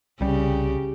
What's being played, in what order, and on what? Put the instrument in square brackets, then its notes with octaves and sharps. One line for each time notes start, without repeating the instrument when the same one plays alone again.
[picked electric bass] C2 G3 [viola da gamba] C#3 G4